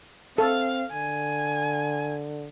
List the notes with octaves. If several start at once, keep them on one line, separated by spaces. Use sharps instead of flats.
C4 A4 F5
D3 G#5